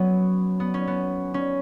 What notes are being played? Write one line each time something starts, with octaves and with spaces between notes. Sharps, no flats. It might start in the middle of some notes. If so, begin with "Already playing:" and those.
Already playing: F#3 B3 C#4
B3
C#4
B3
C#4